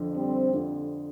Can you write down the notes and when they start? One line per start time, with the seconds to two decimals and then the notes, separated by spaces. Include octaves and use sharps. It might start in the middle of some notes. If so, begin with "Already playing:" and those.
Already playing: F2 D3 F3
0.16 G3 C4
0.53 F2 D3 F3